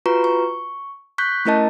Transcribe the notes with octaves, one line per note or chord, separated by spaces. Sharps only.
F4 F#4 B4 A#5 C#6
C#6
C#6 F#6 G6 B6
A3 C#4 E4 A#4 D#5 A5